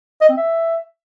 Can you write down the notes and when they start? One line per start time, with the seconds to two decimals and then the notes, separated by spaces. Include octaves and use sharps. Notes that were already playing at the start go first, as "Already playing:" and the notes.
0.21 D#5
0.29 C4
0.37 E5